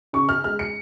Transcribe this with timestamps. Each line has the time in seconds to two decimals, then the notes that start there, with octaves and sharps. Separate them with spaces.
0.13 C#3 C#6
0.29 F6
0.44 G#3 F6
0.59 C#7